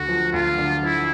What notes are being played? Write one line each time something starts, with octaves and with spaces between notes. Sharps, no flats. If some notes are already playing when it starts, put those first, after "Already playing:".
Already playing: D2 F#4
F3
D2 F4
D3
F3 E4